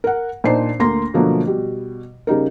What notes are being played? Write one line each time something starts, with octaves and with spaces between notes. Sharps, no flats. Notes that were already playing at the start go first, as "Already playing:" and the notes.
A#4 F#5
A#2 D4 D#4 C5 C7
D2 A#3 C6 A#6
B2 D3 F3 F#3 A3 A#3
B2 G3
C#3 G3 D#4 A#4